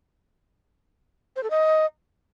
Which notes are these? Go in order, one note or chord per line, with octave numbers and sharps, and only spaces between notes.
C5
A4
D#5